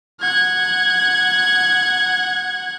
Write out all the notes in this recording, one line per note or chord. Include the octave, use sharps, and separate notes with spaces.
F#5 G#6